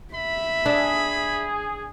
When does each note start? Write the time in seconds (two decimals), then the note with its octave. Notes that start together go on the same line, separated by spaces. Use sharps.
0.14 E5 B5
0.66 D4 G#4